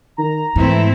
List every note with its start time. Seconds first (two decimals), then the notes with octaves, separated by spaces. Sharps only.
0.18 D#3 A#5
0.56 G#2 E3 A3 C4 E4